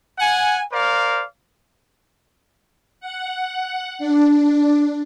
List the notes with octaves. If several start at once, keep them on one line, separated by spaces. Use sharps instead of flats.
F#5 G#5
A#4 C5 D5 F5
F#5
D4